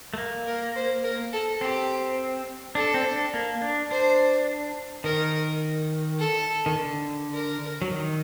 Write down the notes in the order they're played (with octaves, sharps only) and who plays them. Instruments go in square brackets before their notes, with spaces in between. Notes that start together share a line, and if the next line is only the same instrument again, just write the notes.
[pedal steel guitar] A3
A#3
[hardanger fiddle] A#4
C5
A#4
A4
[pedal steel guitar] C4 [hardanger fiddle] G4
[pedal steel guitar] D4 [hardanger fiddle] A4
[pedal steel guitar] C4
D4
A#3
D4
[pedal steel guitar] D4 [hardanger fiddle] C5
[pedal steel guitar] D#3 [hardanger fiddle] A#4
[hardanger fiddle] A4
[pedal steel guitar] D#3
D3
[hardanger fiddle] A#4
[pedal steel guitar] F#3
D#3